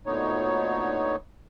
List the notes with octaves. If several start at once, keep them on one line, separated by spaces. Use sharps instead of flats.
D2 A#2 D3 B3 D#4 C#5